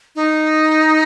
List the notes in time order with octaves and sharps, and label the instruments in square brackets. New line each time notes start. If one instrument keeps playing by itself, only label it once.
[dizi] D#4